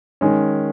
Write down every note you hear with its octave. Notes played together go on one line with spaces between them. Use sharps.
D#3 G#3 C#4